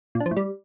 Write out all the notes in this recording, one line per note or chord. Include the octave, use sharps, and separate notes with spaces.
A#2
D4
F3
A2
G3